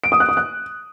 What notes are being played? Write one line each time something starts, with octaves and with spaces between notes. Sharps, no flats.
D7
D#6
F#6
D#6
F#6